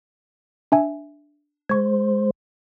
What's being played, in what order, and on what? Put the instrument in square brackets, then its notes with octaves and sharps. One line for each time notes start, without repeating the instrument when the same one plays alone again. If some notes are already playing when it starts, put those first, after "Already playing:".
[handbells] D4 E5 G#5
[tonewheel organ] G#3 C5 [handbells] C#6 G#6